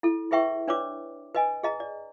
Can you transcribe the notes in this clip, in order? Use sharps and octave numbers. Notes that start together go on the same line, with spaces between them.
E4 A4
E4 G#4 B4 E5 G5 C#6
D4 B4 C#5 D5 D6
B4 D#5 G#5
G#4 D#5 A#5
D5